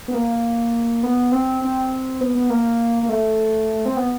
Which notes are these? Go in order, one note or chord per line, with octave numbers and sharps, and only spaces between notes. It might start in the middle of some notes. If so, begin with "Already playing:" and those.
B3
A#3
B3
C4
C4
B3
B3
A#3
A#3
A3
C4
B3